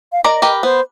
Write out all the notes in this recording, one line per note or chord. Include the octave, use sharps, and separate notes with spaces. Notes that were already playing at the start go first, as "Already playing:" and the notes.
F5
A#4 D5 D#5 A#5
G4 A#4 B4
B3 C5